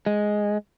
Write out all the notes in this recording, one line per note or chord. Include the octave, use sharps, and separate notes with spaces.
G#3